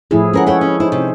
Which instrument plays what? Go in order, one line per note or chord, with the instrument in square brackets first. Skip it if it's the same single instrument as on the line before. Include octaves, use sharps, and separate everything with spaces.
[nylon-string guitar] A2 [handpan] F3 E4 G#4
[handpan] G#3 C#4 B4 [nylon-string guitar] G#4 A#4 F#5
[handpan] G#4 A4 C#5 [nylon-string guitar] E5 F#5 G5
[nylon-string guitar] C#4
[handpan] D#4 C5 [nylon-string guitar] E4
[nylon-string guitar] C3